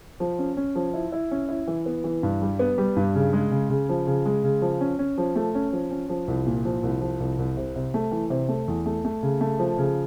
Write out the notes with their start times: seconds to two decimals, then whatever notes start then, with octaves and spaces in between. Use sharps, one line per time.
0.20 F3
0.39 C#4
0.57 C#4
0.75 F3
0.94 E4
1.12 E4
1.31 C#4
1.49 E4
1.67 E3
1.86 B3
2.04 E3
2.23 G2
2.42 G3
2.59 B3
2.78 G3
2.96 G2
3.15 C#3
3.33 G#3
3.51 C#3
3.70 C#3
3.89 F3
4.07 C#3
4.26 G#3
4.44 C#3
4.62 F3
4.81 C#4
4.99 C#4
5.18 F3
5.36 A3
5.55 C#4
5.73 F3
5.91 C#4
6.09 F3
6.28 C2
6.47 A#2
6.65 F3
6.83 C2
7.01 F3
7.20 C2
7.39 C2
7.57 C3
7.76 C3
7.94 A3
8.12 E3
8.30 C3
8.49 A3
8.68 E2
8.86 A3
9.05 A3
9.23 C#3
9.41 A3
9.59 F3
9.78 C#3